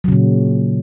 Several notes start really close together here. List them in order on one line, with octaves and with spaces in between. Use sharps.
F#3 C#3 A#2